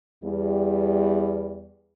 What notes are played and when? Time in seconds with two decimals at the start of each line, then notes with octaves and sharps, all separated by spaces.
0.24 E2 G3